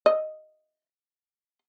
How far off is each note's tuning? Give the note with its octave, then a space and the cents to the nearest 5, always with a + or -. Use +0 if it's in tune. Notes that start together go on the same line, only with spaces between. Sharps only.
D#5 -5